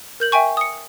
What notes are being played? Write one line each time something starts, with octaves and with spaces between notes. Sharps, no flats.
A#4 G6 F#7
E5 G5 G#5 C#6
D#6 C#7